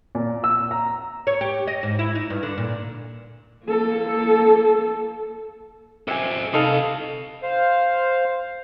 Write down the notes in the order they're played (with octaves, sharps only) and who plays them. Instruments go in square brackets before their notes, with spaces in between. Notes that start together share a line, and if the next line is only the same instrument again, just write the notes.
[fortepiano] A#2
E6
A#5
[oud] C#5
G4
D#5
G#2
E4
D#4
G2
D3
A#2
[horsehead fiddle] A#3 A4
[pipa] C3 G#5 [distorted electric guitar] A4 C5
[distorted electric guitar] C3 B5 [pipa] D#4 A4 F5
[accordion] C5 F5